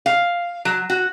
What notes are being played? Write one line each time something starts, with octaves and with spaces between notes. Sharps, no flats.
F5
F#3
F#4